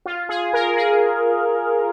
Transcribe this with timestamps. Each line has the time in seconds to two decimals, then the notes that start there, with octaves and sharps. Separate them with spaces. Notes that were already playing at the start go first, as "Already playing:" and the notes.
0.06 F4
0.29 G#4
0.53 A#4
0.77 G#4